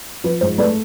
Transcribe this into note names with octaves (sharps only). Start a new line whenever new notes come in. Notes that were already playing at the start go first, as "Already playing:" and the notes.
F3 B4
G#2 C5
A3 B4 D5